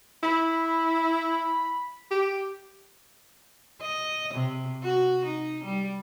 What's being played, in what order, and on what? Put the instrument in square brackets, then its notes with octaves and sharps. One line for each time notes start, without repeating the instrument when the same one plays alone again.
[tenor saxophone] E4 [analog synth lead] B5
[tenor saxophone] G4
[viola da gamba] D#5
C3
F#4
D#4
G3